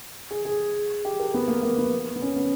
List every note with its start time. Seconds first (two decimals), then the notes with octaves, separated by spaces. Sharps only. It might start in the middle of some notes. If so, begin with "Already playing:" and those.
0.31 G#4
0.45 G#4
1.05 G4
1.20 A#4
1.34 B3
1.48 A#3
1.63 A#3
1.78 B3
2.16 B3
2.22 C#4
2.36 B3